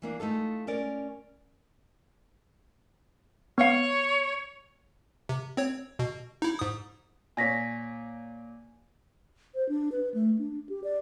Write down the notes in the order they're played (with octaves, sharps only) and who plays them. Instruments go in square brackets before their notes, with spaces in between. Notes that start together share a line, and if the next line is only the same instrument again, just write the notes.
[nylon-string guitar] E3 A#3 D4
A3 D#4 F4 A4
C#4 A#4 D5
[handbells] B3 F5 [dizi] C#5
[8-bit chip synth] C3
C4 C#5
B2
D#4 E4
G#2 D#6
[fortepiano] A#2 C#5 [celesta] G#5 A#6 B6
[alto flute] C5
D4
B4
A3
D4
G4
D5